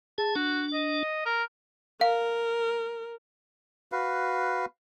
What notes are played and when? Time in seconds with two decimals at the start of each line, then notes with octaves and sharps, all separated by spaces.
0.18 G#4 A5
0.35 D4 F#4
0.73 D#5
1.26 A#4
2.01 A#4 F5
3.92 F#4 B4 F5